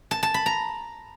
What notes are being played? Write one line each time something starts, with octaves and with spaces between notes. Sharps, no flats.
A5
A5
B5
A#5